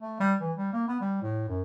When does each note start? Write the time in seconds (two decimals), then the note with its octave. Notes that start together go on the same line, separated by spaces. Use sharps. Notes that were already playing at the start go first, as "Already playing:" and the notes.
0.02 A3
0.20 G3
0.41 E3
0.57 G3
0.73 A#3
0.88 B3
1.01 G3
1.22 A2
1.49 F#2